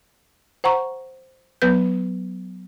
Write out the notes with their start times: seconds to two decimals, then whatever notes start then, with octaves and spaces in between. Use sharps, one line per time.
0.64 C5 F#5 A#5 C#6
1.62 F#3 B3 B4 G6